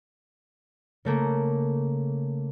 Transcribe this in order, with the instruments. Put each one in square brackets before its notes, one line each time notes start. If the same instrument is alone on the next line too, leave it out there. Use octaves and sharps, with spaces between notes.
[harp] C#3 A3 A#3